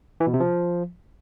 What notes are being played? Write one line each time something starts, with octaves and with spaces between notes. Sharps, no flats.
E3
B2
C3
F3